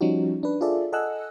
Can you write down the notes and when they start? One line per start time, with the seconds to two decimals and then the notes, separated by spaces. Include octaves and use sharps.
0.01 F3 G3 C#4 D#4 F#4
0.43 D4 B4
0.61 F4 G#4 A4 D5 E5
0.93 A4 D#5 F#5 G#5 E6 F#6